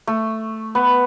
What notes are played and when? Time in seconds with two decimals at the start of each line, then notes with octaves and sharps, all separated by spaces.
0.07 A3
0.75 B3